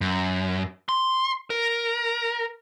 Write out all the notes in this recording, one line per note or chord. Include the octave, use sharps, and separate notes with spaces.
F#2
C6
A#4